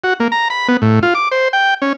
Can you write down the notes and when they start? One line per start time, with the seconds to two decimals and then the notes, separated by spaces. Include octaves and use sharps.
0.04 F#4
0.20 A#3
0.32 A#5
0.50 B5
0.68 B3
0.82 A2
1.03 F4
1.15 D6
1.31 C5
1.53 G5
1.82 C#4